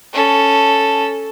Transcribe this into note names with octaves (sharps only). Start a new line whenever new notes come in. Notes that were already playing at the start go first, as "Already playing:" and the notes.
C#4 A4